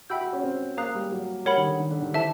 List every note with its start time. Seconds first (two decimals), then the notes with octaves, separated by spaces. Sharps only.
0.10 F#4 E5 G5 B5 E6 G6
0.21 F#4
0.33 C#4
0.44 C4
0.77 A#3 C5 F5 A#5 D#6 F#6
0.95 G3
1.12 F#3
1.45 G3 A#4 C#5 F#5 B5
1.57 D#3
1.68 D3
1.80 D#3
1.91 D3
2.02 D#3
2.14 E3 A4 C5 E5 A5